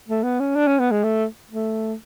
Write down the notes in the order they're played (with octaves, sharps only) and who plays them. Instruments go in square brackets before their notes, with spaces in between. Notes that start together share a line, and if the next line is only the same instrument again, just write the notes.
[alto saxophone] A3
B3
C#4
D4
C#4
B3
G#3
A3
A3